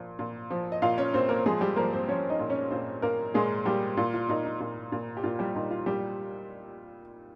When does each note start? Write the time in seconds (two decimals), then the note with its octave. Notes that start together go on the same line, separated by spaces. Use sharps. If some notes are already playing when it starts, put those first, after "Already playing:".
Already playing: A#2 F3
0.19 A#2
0.51 F3
0.72 D#5
0.82 A#2 F4 F5
0.98 C#4 C#5
1.14 A#2 C4 C5
1.29 A#3 A#4
1.46 F3 G#3 G#4
1.61 G3 G4
1.76 F3 A#3 A#4
1.93 C4 C5
2.08 F3 C#4 C#5
2.30 D#4 D#5
2.39 A#2
2.50 C#4 C#5
2.71 A#2 C4 C5
3.02 A#2 A#3 A#4
3.34 A#2 G#3 G#4
3.65 A#2 G3 G4
3.97 A#2 F4
4.14 F4
4.29 A#2 D#4
4.45 D#4
4.60 A#2
4.92 A#2
5.17 G4
5.23 A#2 F4
5.39 G3 G4
5.55 A#2 D#4
5.71 F4
5.86 A#2 G3 G4